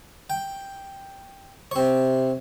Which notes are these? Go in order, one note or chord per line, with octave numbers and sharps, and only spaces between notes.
G5
C3 C4 C#5